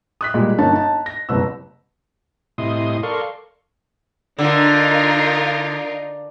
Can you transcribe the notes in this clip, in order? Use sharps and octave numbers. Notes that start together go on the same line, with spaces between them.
D#6 F#6 B6
A#2 G3 G#3
G1 A#3 C#4 D#4 A5
D#4 A5
A#6
F#1 C2 B4 E6
A2 C3 E4 D#5 C6 D#6
A4 A#4 D5 F5 C6 C#6
D3 D#4 F4 A#4